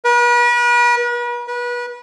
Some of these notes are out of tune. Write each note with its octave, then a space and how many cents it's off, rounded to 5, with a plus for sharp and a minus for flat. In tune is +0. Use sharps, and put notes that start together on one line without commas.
B4 -40
B4 -30